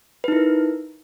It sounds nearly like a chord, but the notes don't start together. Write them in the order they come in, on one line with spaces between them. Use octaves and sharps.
B4 D#4 E4 A#4